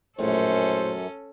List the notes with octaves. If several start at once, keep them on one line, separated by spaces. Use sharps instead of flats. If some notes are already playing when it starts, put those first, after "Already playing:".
A#1 F#2 A2 C#4 A4 C5